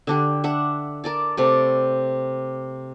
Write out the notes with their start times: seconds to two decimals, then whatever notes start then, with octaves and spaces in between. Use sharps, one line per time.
0.07 D3 D4 G4
0.44 D4 E5 F#5
1.04 A#4 D5 A5
1.37 C3 A3 D5